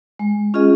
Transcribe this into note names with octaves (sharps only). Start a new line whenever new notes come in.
G#3
C#4 F4 G#4 D#5